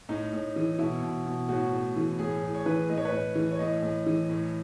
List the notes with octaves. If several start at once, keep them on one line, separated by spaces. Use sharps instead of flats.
A2 D#4
A2
E3
B2 E4
B2
B2
A2 F#4
A2
E3
A2 G#4
A2
C#5
E3 B4
A2 D#5
C#5
B4
A2 C#5
E3
C#5
A2 D#5
A2
E3
A2